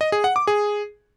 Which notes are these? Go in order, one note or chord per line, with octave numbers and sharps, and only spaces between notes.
D#5
G#4
F#5
D6
G#4